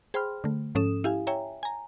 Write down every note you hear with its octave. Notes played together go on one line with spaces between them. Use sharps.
G#4 C5 G5 B5 C6 F6
D3 A3
G#2 F3 C#4 A4 D#6 E7
E4 G4 F5 G#5
C#5 E5 G5 G#5 A#5
G#5 A#5